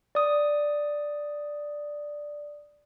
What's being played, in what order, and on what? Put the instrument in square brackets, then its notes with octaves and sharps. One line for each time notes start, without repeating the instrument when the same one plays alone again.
[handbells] D5 D#6